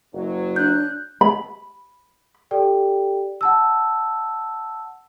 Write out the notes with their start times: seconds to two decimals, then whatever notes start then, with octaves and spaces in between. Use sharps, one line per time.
0.13 F#1 F#3
0.56 D4 F#6 G6
1.21 B5
2.51 G4 A4 D5 G5
3.41 F#5 A5 E6